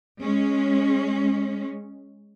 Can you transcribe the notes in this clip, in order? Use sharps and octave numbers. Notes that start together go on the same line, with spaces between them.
G#3 C#4